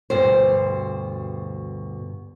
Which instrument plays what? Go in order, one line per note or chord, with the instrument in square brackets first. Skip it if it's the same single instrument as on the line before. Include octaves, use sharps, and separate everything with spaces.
[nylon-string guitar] D2 G2 B2 C5